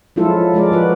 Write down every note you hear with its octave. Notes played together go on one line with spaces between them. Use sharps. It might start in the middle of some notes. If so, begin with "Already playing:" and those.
F3 F#3 G#3 E4 F4 A4
F3 G#3 A#4 D5
F3 F#4 B4